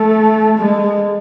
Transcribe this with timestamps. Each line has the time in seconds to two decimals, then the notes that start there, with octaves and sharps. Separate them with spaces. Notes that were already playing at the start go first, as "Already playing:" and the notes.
Already playing: A3 A4
0.58 G#3